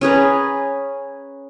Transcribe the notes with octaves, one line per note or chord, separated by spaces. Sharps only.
C#4 G#4 B4 A#5